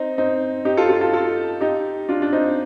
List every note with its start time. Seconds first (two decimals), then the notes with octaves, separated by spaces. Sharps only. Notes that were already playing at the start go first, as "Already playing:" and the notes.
Already playing: C4 D#4
0.18 C4 D#4
0.65 D#4 G4
0.77 F4 A4
0.89 F4 A4
1.01 F4 A4
1.13 F4 A4
1.61 D#4 G4
2.09 D4 F4
2.22 D4
2.32 C4 D#4